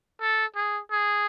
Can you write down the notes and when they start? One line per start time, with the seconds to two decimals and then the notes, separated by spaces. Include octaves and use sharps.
0.21 A4
0.55 G#4
0.91 G#4